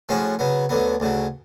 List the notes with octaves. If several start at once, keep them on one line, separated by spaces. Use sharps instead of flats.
A2 F3 G#3 C#4 F#4
C#3 F#3 B3
D2 D3 F#3 B3
D2 C#3 F#3